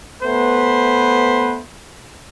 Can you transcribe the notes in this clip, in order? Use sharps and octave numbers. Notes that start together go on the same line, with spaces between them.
A3 B3 B4 C5